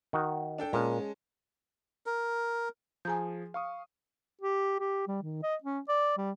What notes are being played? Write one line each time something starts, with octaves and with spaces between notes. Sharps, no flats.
D#3 F#4
D4 A4 G5
A#2 G#3 C#4 A5
A#4
F3 G#4 G#5 A#5 G6
F5 C#6 D#6
G4
G4
G3
D#3
D#5
C#4
D5
G3